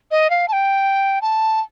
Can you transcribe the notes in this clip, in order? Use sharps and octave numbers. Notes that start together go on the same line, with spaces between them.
D#5
F5
A5
G5
A5